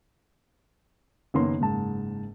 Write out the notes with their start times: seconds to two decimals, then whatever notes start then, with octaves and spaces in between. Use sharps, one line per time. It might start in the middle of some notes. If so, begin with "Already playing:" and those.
1.34 F#1 D#3 A#3 B3 C#5 C6
1.60 F#1 G#2 A5